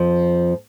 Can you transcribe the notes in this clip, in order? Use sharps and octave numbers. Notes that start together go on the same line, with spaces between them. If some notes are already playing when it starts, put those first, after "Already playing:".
Already playing: F2 F3